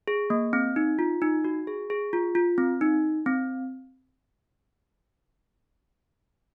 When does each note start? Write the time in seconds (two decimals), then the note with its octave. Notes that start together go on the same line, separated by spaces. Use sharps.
0.08 G#4
0.30 A#3
0.53 C4
0.76 D#4
0.99 F4
1.22 D#4
1.44 F#4
1.67 G#4
1.90 G#4
2.13 F4
2.35 F4
2.58 C4
2.81 D#4
3.26 C4